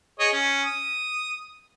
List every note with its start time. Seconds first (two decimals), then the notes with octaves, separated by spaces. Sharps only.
0.19 G#4 C#5 D#5
0.33 C#4
0.64 D#6